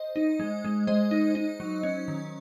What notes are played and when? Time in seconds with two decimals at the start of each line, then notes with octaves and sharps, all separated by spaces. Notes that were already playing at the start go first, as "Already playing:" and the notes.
Already playing: C5 D#5
0.16 D#4
0.40 G#3
0.64 G#3
0.87 G#3 C5 D#5
1.11 D#4
1.35 D#4
1.60 F#3
1.83 C#4
2.08 D#3